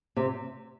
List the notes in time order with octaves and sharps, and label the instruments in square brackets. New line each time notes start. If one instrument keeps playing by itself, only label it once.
[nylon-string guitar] C3